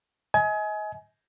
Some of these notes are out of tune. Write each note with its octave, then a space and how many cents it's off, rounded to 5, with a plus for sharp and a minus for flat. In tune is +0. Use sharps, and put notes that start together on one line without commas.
D#5 +35 G#5 +25